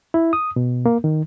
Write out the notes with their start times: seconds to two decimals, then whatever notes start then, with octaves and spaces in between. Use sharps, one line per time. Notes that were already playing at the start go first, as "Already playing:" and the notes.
0.14 E4
0.33 D#6
0.56 B2
0.86 A#3
1.04 D#3